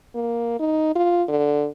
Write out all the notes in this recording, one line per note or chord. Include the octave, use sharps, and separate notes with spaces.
A#3
D#4
F4
D3